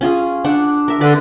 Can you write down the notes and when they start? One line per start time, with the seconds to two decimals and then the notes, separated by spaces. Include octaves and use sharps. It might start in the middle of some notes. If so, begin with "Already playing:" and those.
0.01 C#4 F4 G#4
0.44 D4 F#5
0.88 A#4 E5
1.01 D3 B4 D5 D6